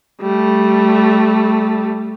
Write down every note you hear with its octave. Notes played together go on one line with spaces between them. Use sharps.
G3 A3